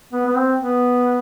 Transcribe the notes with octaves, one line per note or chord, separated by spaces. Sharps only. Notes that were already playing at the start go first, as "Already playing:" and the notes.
B3
B3
C4
B3